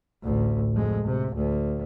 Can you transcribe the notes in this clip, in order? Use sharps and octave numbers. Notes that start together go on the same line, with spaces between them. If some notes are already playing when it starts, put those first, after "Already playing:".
A1 D2
F2 G#3
C3
D2